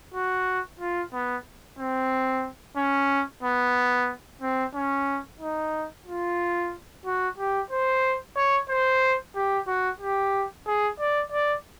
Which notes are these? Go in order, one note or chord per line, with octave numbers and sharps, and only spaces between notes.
F#4
F4
B3
C4
C#4
B3
C4
C#4
D#4
F4
F#4
G4
C5
C#5
C5
G4
F#4
G4
G#4
D5
D5